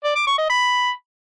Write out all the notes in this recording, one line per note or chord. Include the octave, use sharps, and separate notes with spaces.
D5
D6
C#6
D#5
B5